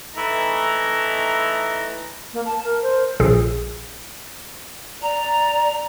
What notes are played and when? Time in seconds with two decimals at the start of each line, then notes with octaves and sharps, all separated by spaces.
0.15 E3 A3 D#4 E4 A#5
2.33 A#3
2.45 A5
2.64 A#4
2.82 C5
3.20 A#1 A#2 G#4
5.02 D5 A#5